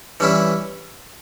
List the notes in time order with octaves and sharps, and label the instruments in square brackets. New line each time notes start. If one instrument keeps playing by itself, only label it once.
[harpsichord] E3 G3 C#4 E4